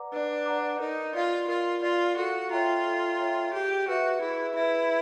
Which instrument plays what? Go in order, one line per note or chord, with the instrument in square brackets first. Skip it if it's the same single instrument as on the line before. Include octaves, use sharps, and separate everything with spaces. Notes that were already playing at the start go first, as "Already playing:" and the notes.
Already playing: [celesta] B4 D5 F#5 A#5 D6
[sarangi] D4 [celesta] B4
[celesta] D5 F#5 A#5 D6
[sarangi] D#4 [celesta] A#4
[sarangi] F4 [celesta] D5 F5
[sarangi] F4 [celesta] A#4
[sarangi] F4 [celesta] D5 F5
[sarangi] F#4 [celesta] A4
[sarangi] F4 [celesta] C#5 E5 G5 A#5
[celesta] A4
C#5 E5 G5 A#5
[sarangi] G4 [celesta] G#4
[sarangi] F#4 [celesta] B4 E5
[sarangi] E4 [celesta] G#4
[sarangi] E4 [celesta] B4 E5